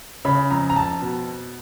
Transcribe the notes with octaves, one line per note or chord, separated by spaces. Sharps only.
C#3 B5
F2 A#5
A#5
F2 A5
B2